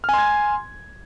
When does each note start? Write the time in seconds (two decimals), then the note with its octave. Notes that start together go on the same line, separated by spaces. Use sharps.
0.04 F6
0.09 G#5
0.14 C6
0.18 G#6